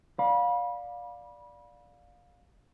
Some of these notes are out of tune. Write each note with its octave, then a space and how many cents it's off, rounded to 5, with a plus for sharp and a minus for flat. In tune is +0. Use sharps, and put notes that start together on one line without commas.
D5 +0 F5 +25 B5 -25